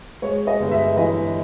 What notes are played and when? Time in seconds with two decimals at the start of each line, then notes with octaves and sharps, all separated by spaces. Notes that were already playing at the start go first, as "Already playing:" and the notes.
0.22 G#3 C#5
0.47 D#5
0.60 G1
0.71 E5
0.97 E3 D#5